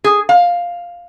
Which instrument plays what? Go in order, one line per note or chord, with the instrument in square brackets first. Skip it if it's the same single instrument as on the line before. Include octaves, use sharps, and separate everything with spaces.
[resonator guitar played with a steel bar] G#4
F5